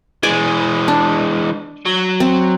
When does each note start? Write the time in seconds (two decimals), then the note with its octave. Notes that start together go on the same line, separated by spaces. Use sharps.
0.23 E3 G#3 D5 G#5
0.88 D4
1.85 F#3
2.20 C4